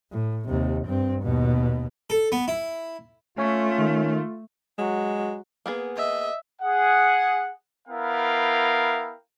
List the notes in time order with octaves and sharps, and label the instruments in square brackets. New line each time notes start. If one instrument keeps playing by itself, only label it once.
[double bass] A2
D#2 C3
G2 C4
D#2 B2
[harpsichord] A4
B3
E4
[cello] A3 [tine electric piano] C#4 C#5 [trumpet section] F4
[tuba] D#3
[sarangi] F#3 [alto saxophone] G#3
[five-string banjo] A#3 B3 G#4
[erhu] D#5 [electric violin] E5
[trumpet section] G#4 F#5
B3 E4 A#4 F5 G5